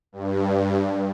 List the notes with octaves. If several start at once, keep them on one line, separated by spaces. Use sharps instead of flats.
G2